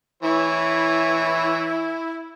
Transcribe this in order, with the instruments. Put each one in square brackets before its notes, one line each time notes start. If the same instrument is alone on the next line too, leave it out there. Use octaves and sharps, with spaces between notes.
[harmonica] E3 C#5 [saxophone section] E4